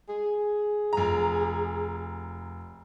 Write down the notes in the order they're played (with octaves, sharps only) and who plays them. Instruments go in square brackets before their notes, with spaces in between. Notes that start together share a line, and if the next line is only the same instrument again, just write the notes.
[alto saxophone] G#4
[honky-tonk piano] F1 A#5